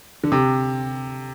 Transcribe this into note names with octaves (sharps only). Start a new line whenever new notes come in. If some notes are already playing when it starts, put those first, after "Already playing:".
D3
C3